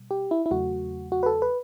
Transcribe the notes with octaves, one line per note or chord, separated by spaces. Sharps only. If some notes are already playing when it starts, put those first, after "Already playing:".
Already playing: B2 G3
G4
E4
E4
E2 C#3 F#3 A3 F#4
F#4
B4
A4
B4